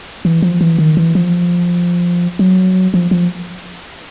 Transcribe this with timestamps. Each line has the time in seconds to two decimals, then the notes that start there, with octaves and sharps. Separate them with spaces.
0.25 E3
0.42 F3
0.61 E3
0.79 D#3
0.97 E3
1.15 F3
2.39 F#3
2.94 F3
3.11 F3